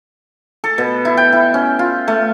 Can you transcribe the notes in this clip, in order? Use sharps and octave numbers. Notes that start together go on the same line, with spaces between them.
A4
B2
E4
G5
E4
C#4
F4
A3